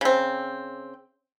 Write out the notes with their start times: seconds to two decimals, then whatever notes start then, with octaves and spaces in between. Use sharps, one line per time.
0.01 C#3 C4